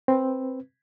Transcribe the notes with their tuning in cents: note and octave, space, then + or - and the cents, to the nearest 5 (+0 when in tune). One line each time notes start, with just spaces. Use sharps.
C4 +5 B4 +0